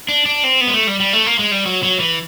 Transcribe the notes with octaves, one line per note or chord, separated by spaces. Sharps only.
D4
D4
C4
B3
G#3
A3
G3
G3
A3
A#3
G#3
G3
F#3
F#3
E3